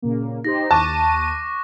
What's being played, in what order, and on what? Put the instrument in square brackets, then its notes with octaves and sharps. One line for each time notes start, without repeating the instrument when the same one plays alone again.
[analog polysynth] A#2 C#3 A#3
[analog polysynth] D#4 G4 C5 [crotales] A#6
[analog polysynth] D#2 D#7 [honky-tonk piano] A5 [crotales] C#6 D6 F#6